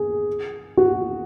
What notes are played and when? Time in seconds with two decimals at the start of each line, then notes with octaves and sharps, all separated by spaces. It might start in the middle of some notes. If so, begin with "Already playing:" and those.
Already playing: G#4
0.77 F#4